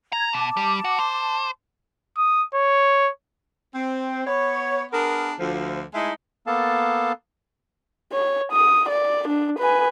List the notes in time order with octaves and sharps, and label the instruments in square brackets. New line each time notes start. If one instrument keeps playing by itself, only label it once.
[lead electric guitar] A#5 [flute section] G#6
[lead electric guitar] B2 [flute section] A5 D6
[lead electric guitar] G3
F#4
C5
[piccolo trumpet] D#6
C#5
[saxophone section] C4
B3 C#5
B3 D4 G#4 A#4
D2 F3
G#3 A3 D#4 E4 E5
[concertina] A#3 B3 A4 F5 A5
[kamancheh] C#5
D#6
D5
D4
B4 G#5